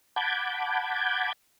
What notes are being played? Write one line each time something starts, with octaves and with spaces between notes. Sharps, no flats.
F#5 A5 B5 D6 G6 G#6